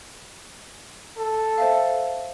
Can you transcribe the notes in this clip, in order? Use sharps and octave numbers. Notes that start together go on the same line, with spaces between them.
A4
C5 E5 F5